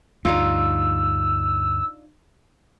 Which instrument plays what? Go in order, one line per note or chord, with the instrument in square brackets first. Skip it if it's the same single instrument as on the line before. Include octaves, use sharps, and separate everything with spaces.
[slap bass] D2 G2 [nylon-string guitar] D4 D#4 F4 [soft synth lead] E6